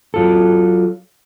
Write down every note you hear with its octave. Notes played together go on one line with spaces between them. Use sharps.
F#3 F4 A4